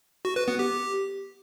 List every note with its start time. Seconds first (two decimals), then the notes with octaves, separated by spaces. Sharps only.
0.25 F#4
0.36 B4
0.48 B3
0.59 G4